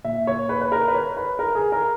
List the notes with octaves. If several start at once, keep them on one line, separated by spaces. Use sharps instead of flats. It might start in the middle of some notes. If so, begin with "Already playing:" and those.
A#2 E5
C#5
B4
B4
A#4
B4
C#5
B4
A#4
G#4
A#4